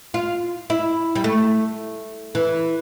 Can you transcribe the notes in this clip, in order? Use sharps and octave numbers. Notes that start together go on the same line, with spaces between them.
F4
E4
G3
A3
E3